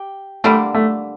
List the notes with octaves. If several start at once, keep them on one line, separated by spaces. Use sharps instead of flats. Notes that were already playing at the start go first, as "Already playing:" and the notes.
Already playing: G4
D3 G3 A3 A#3
A3